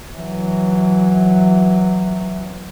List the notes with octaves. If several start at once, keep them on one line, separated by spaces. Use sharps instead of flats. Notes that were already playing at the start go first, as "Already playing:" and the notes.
E3 F#3